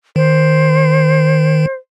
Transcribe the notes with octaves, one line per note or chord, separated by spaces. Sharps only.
D#3 C5